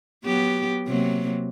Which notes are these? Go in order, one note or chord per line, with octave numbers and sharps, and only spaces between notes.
F#3 B3 G4
C3 F#3 A#3